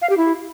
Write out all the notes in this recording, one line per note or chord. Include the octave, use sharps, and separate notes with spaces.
F5
G4
E4